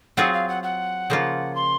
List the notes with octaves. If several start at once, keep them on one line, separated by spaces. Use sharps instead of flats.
F#3 C4 F4 G#4 F#5
F5
F#5
F#5
C#3 F3 A#3 F4
C6